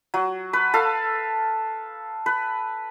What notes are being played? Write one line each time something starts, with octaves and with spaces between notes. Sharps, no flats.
F#3
B4
A4 F5
B4